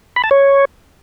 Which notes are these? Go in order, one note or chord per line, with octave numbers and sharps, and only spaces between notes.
B5
A5
C#5